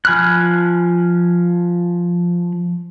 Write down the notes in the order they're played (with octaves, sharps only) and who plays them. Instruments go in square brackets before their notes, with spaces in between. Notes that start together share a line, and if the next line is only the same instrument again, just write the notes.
[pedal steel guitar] F3 G#5 B5 F6 F#6